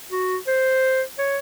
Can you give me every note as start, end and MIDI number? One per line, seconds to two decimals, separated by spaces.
0.11 0.37 66
0.47 1.02 72
1.18 1.38 73